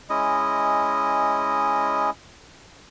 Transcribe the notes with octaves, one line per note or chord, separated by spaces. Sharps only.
G#3 C#4 E4 D#5